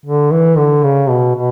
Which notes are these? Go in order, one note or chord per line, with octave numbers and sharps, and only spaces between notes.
D3
E3
D3
C#3
B2
B2